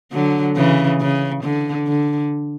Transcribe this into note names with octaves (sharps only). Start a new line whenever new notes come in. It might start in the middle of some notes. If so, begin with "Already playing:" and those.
D3 F#3
C#3 E3
C#3
D3
D3